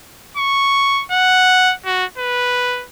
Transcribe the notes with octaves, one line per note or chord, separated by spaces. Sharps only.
C#6
F#5
F#4
B4